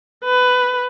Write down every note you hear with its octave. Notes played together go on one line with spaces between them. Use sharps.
B4